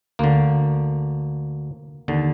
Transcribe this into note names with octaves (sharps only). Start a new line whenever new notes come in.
D2 D3 A#3
D#2 D3